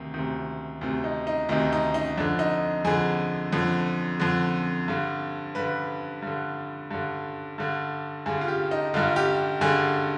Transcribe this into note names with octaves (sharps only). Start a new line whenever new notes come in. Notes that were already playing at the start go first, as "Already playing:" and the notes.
Already playing: D2 C3 D#3
D2 C3 D#3
D2 C3 D#3
D#4
D#4
D2 C3 D#3 D#4
D#4
D#4
F2 D3 D4
D#4
F2 D3 G#4
F2 D3
F2 D3
G2 D3
G2 D3 B4
G2 D3
G2 D3
G2 D3
G2 D3 G#4
F4
G4
D#4
G2 D3 F4
G4
G2 D3 G#4